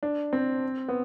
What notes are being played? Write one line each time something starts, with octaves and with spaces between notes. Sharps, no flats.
D4
C4
B3